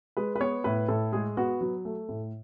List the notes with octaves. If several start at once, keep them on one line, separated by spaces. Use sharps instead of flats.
G#3 B4
B4
B3 C#5
A2 B4
A2 A4
G#3 G#4
B3 F#4
F#3
A3
A2